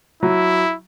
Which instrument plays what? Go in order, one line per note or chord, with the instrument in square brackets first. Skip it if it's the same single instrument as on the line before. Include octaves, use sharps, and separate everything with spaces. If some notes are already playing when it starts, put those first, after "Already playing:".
[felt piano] F#3 [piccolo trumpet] E4